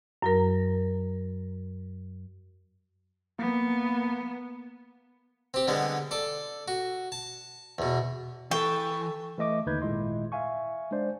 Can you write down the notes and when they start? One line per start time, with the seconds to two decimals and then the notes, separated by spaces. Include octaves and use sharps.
0.22 F#2 F#3 A#4
3.39 A#3 B3
5.54 C4 G4
5.67 D3 G3 G#3 B3
6.11 A4 D5
6.68 F#4
7.12 A5
7.78 E2 B2
8.51 E3 A4 G5 C#6
9.38 E3 A3 D#5 D6
9.66 D#2 D3 D#4 B4 G6 G#6
9.82 G#1 A#2 G#3 E4 D#5 C6
10.32 E5 F5 G#5 C#6
10.91 G#3 D4 C5 D5